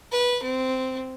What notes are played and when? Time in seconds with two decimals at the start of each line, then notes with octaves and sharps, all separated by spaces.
0.12 B4
0.43 C4